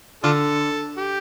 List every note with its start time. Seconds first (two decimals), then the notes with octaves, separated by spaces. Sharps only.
0.23 D3 D4 F4 A4
0.98 G4